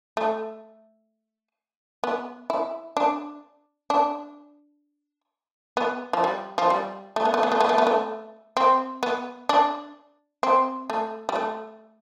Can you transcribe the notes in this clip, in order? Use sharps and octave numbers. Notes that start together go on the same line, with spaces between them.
A3
B3
E4
D4
D4
B3
F3
G3
F3
G3
A3
B3
A3
B3
A3
B3
A3
B3
A3
C4
B3
D4
C4
A3
G3
A3